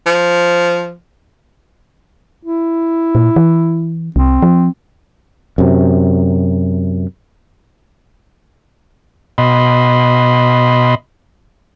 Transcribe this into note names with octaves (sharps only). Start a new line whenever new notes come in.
F3
E4
A#2
E3
C2 C4
F3
F#2 C3
B2 D#5 B5 C6